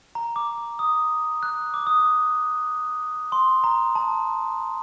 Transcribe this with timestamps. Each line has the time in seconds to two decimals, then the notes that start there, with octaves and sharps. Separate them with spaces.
0.15 A#5
0.36 D6
0.58 D6
0.79 D#6
1.43 F#6
1.74 D6
1.87 D#6
1.99 D6
3.32 C6
3.64 A#5
3.95 A5